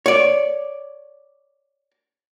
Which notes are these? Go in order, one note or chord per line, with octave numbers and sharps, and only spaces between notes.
C#5 D5